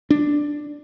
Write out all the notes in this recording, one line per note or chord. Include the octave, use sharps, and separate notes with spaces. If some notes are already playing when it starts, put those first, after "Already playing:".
D4